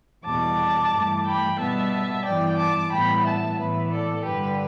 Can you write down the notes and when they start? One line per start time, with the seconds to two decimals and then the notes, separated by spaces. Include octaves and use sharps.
0.25 E2 B2 G3 A5 D6
0.92 G2 E3 A3
1.25 G5 B5
1.58 B2 G3 B3 E5 A5
2.25 G2 E3 B3 D5 G5
2.58 A5 D6
2.91 A2 E3 G3 B3 G5 B5
3.25 E5 A5
3.58 A2 E3 B3 B4 E5
3.92 A4 D5
4.25 G2 D3 G3 G4 B4